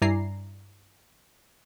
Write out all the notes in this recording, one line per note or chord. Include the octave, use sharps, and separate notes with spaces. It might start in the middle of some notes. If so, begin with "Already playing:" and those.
G2 E4 D5 G#5 A#5 C7